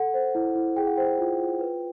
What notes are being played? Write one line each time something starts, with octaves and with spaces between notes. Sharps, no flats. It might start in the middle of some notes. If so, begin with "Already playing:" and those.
Already playing: A4 F#5
C5
E4
E4
G#4 G5
F#5
C5 G5
F4
F4
B4